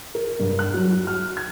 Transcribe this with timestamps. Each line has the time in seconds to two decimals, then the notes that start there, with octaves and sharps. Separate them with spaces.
0.15 A#4
0.40 G2
0.59 F#6
0.74 F#3
0.92 F#4
1.07 F6
1.37 G#6